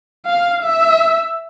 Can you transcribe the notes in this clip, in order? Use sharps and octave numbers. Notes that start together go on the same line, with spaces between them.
F5
E5